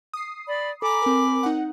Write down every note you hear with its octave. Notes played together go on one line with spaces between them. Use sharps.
D#6 C7
D5 B5
A4 G#5 A#5 B5 D6
C4 A#4
D#4 F#5